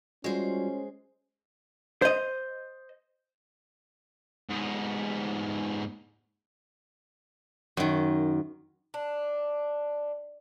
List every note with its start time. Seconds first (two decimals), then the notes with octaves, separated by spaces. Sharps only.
0.24 G3 G#3 C#4 F4 F#4 C5
2.02 C5 D#5
4.49 G#2 B3
7.77 F#2 D#3
8.94 D4